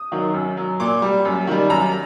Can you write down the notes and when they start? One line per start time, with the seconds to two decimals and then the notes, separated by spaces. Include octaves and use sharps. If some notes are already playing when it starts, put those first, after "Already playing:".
Already playing: D#6
0.12 D#3 F#3
0.34 F#2
0.57 F#3
0.80 A#2 D6
1.02 G3
1.25 F#2
1.47 D#3 G3
1.70 F#2 A#5